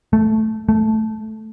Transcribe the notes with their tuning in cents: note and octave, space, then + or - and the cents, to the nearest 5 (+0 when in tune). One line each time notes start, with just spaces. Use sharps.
A3 -5
A3 -5